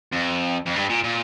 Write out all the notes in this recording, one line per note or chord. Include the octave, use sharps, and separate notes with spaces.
F2
F2
G2
A#2
A#2